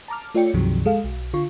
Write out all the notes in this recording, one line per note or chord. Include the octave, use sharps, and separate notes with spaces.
A5 A#5 D6 F6
A3 F4 C#5 D5 G5 C#7
C#2 G2 C3 D#3 F3 F#3
G#3 A4 F5
B1
D3 F4 C#6